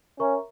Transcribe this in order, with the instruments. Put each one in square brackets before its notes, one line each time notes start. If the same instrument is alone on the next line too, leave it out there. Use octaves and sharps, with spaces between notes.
[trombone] C#4 [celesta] A#4 C#5 E5 A#5 C#6